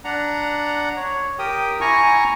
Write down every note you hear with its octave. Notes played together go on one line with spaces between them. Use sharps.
D4 F#5 A#5
C#5
G4 A#4 G5 D#6
E4 G#5 A#5 C#6